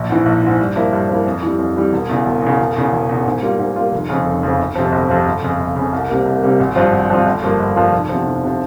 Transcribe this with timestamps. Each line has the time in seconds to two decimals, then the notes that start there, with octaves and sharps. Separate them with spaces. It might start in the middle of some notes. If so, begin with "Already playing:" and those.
Already playing: A#1
0.10 G#2 E3
0.26 A#1
0.43 G#2 E3
0.59 G2
0.76 F3 A#3 E4
0.93 G2
1.09 F3 A#3 E4
1.26 F2
1.43 E3 G3
1.59 F2
1.76 E3 G3
1.92 E1
2.10 E2 C#3
2.26 E1
2.42 E2 C#3
2.59 E1
2.76 E2 C#3
2.93 E1
3.09 E2 C#3
3.25 G#2
3.42 G3 A#3 F4
3.59 G#2
3.76 G3 A#3 F4
3.92 F1
4.09 F2 C#3 F3
4.26 F1
4.43 F2 C#3 F3
4.59 G1
4.75 F2 C3 F3
4.92 G1
5.09 F2 C3 F3
5.26 G1
5.43 F2 C#3
5.59 G1
5.76 F2 C#3
5.93 C2
6.09 C3 G3 A#3
6.26 C2
6.42 C3 G3 A#3
6.60 G#1
6.76 G2 F3 C4 F4
6.92 G#1
7.10 G2 F3 C4 F4
7.26 G1
7.43 G2 F3 A#3 F4
7.59 G1
7.76 G2 F3 A#3 F4
7.92 F1
8.09 E2 C3 F3
8.26 F1
8.44 C3 F3